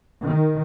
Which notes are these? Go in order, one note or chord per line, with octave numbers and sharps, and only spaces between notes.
D#3